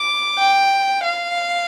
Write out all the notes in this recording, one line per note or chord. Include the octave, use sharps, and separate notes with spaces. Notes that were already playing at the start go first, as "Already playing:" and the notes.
Already playing: D6
G5
F5